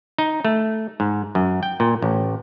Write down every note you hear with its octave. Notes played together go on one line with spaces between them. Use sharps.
D#4
A3
G#2
F#2
G5
A#2
A1